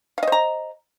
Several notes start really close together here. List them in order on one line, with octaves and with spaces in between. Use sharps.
F5 D#5 C5 A#5